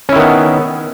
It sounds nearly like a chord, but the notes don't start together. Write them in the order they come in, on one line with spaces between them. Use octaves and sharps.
C#4 E4 D#3 B3